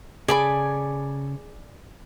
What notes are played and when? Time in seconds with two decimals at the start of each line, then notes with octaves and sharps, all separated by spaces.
0.28 C#3 G#4 A4 D5 G#5 B5 D6